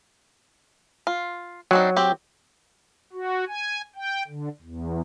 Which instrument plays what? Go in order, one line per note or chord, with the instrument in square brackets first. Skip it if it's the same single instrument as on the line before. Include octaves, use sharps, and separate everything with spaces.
[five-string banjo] F4
[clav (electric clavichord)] F#3 [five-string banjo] C4 D4 D#4
[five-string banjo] C4 G4
[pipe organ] F#4
G#5
G5
D3
E2